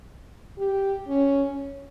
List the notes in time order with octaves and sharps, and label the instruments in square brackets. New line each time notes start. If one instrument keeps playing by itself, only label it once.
[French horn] G4
C#4